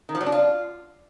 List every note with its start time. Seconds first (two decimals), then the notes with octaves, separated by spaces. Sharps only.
0.09 D#3
0.15 F3
0.21 F#3
0.26 D4
0.32 F4